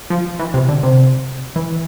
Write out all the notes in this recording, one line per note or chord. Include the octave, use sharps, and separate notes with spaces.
F3
E3
C3
D3
C3
E3